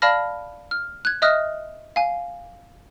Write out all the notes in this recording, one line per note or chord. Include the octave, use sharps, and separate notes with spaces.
D5 F5 A5 B5 F6 A#6
F6
F#6 G#6
D#5 E5 D#6 F6 F#6 A#6
F5 G#5